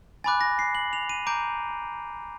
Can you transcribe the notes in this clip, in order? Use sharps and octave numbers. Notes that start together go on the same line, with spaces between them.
G#5 B5 D6 F#6 A6
A#6
C7
F#7
F7
D#7
A#5 D6 G6 D7